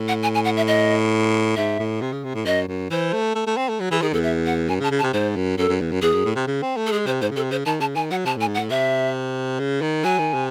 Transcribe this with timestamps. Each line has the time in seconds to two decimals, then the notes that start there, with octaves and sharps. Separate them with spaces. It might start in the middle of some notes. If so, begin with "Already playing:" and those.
Already playing: A2
0.08 F#5
0.23 G#5
0.35 G#5
0.45 F#5
0.57 E5
0.68 D#5
1.56 G#2 E5
1.79 A2
2.01 C3
2.12 C#3
2.24 C3
2.35 A2
2.46 F#2 D#5
2.68 F#2
2.90 E3 C5
3.13 A3
3.35 A3
3.46 A3
3.57 C4
3.68 A3
3.80 F#3
3.91 E3 G#4
4.02 D#3 G#4
4.13 E2 A4
4.24 E5
4.46 F#5
4.69 F#2 G#5
4.80 C#3
4.83 A5
4.91 C#3
4.99 A5
5.03 C3
5.13 G#2 C5
5.36 F#2
5.58 F#2 A4
5.69 F#2
5.81 E2
5.92 F#2
6.02 E2 G#4
6.13 F#2
6.25 A2
6.36 C3
6.47 C#3
6.62 C4
6.77 A3
6.86 A4
6.92 G#3 G#4
7.06 C3 C5
7.21 G#2 C5
7.31 C#3
7.36 C3 A4
7.51 C#3 C5
7.65 D#3 A5
7.80 C#3 A5
7.95 D#3 G#5
8.11 F#3 F#5
8.26 C3 A5
8.36 A2 G#5
8.48 G#2
8.55 F#5
8.59 A2
8.70 C3 E5
9.59 C#3
9.82 D#3
10.04 F#3 G#5
10.19 D#3
10.34 C3